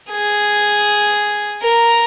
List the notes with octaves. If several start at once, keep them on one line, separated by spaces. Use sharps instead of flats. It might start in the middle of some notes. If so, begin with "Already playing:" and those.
G#4
A#4